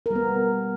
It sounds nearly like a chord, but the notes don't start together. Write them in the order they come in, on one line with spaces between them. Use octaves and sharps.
A#4 G3 B3